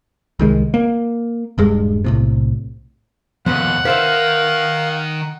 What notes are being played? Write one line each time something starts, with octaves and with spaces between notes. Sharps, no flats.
C2 D#3 G#3
A#3
D#1 G2 G#3
B1 A2 C3
D#2 B2 F3 B3 B4 F#5
D#3 B4 C5 E5 F5